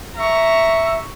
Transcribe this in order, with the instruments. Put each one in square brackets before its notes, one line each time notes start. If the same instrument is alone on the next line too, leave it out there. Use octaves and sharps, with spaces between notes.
[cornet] E5 [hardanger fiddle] A#5 C#6